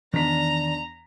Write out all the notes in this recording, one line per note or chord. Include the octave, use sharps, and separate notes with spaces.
E2 D#3 D4 D5 A#5 B6